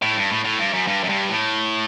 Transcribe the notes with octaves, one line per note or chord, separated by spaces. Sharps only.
A2
G2
A2
A2
G2
F#2
G2
F#2
G2
A2